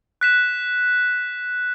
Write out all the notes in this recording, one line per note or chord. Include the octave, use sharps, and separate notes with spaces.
F#6 B6 E7